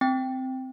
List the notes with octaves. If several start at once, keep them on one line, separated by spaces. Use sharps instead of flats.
C4 G5